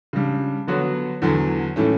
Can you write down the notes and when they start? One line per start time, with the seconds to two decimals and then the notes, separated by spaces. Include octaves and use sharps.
0.13 C#3 G3 D4
0.67 D3 F#3 B3 F#4 C#5
1.22 E2 D3 F#3
1.76 A2 E3 A3 C#4